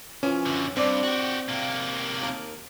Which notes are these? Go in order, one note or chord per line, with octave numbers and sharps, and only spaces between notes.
E3 F3 C#4
F#2 D3
G2 C4 D4 D5 A5
F#4 G4
C3 A#3
D#2 A#4 A5